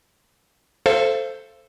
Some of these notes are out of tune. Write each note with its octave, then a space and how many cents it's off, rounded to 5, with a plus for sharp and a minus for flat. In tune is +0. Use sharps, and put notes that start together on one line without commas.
A4 +0 C5 +0 F5 -40